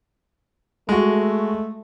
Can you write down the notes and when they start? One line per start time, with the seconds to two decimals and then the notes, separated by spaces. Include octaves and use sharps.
0.89 G#3 A3 F#4